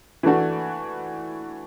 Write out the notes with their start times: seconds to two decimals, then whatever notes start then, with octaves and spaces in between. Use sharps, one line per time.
0.23 E3 A3 D4 F#4